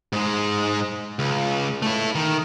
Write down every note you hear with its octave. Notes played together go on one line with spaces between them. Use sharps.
G#2 G#3
C#2
A3 E4
D#3